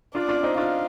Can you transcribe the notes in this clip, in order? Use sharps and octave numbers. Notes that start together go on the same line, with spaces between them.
D4 F4 D5
D4 F4
C4 D#4
D4 F4 F5